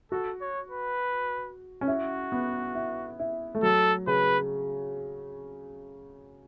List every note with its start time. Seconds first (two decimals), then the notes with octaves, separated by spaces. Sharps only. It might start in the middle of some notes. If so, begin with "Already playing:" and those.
0.11 F#4 A4
0.41 C#5
0.70 B4
1.81 C#4
1.88 E4 F#4
2.32 B3
2.75 E4
3.19 E4
3.55 A3
3.63 F#3 A4
4.07 C#3 B4